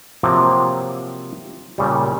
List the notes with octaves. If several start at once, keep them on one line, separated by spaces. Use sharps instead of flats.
C3 F3 F#3 A#3 C4
A#2 C#3 G3